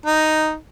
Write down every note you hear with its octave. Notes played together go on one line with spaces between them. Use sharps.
D#4